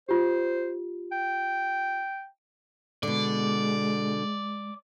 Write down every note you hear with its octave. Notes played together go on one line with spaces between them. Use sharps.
F4 G4 C5
G5
B2 D3 G#3 D5